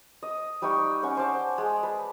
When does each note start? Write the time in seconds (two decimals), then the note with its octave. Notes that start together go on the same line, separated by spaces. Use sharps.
0.22 D#5
0.62 G3 D#4 G5 C#6
1.03 C#4 F#5 C#6
1.17 C5 D5 A5
1.58 G#3
1.83 B4 A5